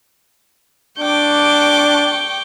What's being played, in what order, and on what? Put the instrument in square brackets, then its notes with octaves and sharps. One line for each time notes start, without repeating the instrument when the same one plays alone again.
[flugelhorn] D4 [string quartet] G5 C#6 D6